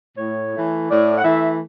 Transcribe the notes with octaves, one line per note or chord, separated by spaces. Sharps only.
A2 C#5
E3 A3
A2 D5
F#5
E3 A3 E5